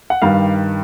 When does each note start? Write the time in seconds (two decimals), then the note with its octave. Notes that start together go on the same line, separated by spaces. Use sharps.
0.10 F#5
0.22 G2 D#3 G3 F5